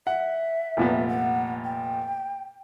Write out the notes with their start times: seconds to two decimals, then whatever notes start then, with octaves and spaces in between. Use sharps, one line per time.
0.07 E5 F#5
0.77 F1 A#2 B3
1.09 F#5
1.64 G5